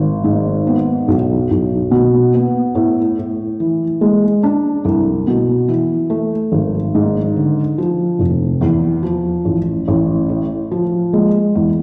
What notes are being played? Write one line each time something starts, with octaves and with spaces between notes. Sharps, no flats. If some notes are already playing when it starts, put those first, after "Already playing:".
Already playing: G#1
G#2
B3
B1
B1
B2
B3
A2
A2
E3
G#3
D4
C2
B2
E3
A3
G#1
G#2
D3
F3
F1
E2
F3
A1
A1
A2
F3
G#3
E2